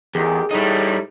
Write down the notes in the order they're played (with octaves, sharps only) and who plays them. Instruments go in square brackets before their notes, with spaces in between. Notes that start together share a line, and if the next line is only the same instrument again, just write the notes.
[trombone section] A1 D#3 G4 [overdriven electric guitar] E2 [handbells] G#4
[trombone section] A2 [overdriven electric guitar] G3 D#4